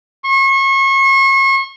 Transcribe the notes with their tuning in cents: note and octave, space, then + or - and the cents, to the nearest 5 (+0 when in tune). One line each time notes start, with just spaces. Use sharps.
C#6 -35